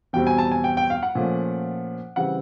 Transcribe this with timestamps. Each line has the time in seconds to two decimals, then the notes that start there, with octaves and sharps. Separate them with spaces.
0.13 E2 B2 G3 C4 G5
0.27 G#5
0.38 A5
0.51 G#5
0.64 G5
0.77 G5
0.90 F5
1.03 F#5
1.15 A#2 F3 A3 C#4
2.16 C#3 E3 G3 C4 F#5